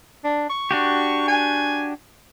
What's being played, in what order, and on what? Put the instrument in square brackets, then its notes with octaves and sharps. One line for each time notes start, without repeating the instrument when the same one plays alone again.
[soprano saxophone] D4
C#6
[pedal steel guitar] D4 F#4 G4
[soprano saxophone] G#5